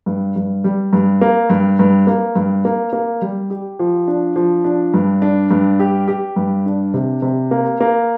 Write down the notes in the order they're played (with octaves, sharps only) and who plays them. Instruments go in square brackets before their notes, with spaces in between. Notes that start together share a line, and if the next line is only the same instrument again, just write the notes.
[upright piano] G2
G2
G3
G2
A#3
G2
G2
A#3
G2
A#3
A#3
G3
G4
F3
D4
F3
D4
G2
D4
G2
G4
G4
G2
D4
C3
C3
A#3
A#3